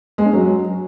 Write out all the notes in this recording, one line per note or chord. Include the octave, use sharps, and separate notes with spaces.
G#3
C#4
F#3